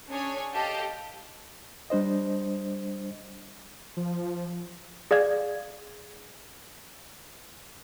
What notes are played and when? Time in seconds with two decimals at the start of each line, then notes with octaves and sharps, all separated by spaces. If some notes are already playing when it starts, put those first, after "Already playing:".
0.10 C#4 D4 G#4 C#5 G#5
0.54 G4 A4 D#5 F5 A5
1.90 G3 D4 C5 D#5
3.97 F3
5.11 G#4 D5 F5 G#6